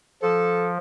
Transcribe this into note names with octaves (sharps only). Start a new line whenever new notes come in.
F3 A4